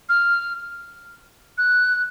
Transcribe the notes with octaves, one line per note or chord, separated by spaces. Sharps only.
F6
F#6